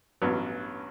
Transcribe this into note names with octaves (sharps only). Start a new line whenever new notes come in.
A1 G2 F#3 B3